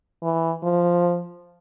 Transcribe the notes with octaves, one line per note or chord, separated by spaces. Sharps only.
E3
F3